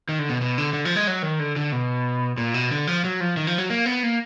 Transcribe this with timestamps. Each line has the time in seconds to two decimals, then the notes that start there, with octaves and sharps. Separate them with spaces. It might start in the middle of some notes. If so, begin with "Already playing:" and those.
0.09 D#3
0.19 D3
0.29 B2
0.42 B2
0.58 D3
0.73 D3
0.85 F3
0.96 G#3
1.07 F#3
1.23 D#3
1.40 D3
1.56 D3
1.72 B2
2.38 A#2
2.54 B2
2.71 D3
2.87 F3
3.04 F#3
3.20 F3
3.37 D#3
3.47 F3
3.58 F#3
3.70 A#3
3.86 B3
4.03 A#3